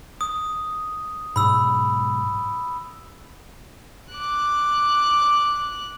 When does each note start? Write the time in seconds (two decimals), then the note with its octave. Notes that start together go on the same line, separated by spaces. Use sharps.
0.21 D#6
1.36 B1 G#2 B5 E6
4.11 D6 F#6